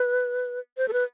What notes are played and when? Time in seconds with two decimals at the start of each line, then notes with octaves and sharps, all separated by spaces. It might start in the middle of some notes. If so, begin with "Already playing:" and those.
Already playing: B4
0.78 C5
0.88 A4
0.93 B4